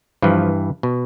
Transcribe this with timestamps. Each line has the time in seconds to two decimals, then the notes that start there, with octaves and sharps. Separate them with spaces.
0.22 G2 E3 F3
0.83 B2